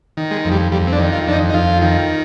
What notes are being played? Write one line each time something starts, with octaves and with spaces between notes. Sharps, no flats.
D#3
G#3
F2
G3
F2 G3
C4
D4
D#3
F4
F2 D4
D#4
D#4
F2 F4
D#3